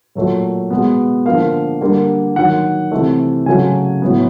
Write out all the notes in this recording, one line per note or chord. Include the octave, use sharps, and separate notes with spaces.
A#2 F#3 A3
B2 G#3 B3
D3 F3 A#3 F5
D3 G3 A#3
D#3 F#3 A#3 F#5
C3 E3 A3
C#3 F#3 A3 G#5
A2 F#3 B3